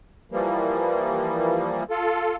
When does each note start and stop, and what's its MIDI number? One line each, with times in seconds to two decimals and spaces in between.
0.32 1.84 52
0.32 1.84 53
0.32 1.84 55
0.32 1.84 58
1.90 2.36 65
1.90 2.36 69